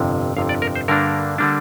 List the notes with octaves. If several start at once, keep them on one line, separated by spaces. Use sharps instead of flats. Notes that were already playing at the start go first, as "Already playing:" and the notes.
Already playing: G1 F2 C3
G1 F2 C3 F5
D5
A#4
C5
G2 D3 G3 A#3 D4 A#4
D3 G3 A#3 D4